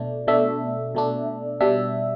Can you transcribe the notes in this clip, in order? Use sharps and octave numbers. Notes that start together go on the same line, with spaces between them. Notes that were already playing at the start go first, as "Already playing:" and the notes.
Already playing: B2 A3 D4
B2 A3 D4 E5
B2 A3 D4
B2 G3 D4 E5